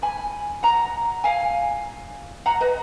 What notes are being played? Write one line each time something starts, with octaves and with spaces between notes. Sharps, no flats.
G#5 B5
F#5 A#5
F5 G#5
F#5 A#5
B4 D#5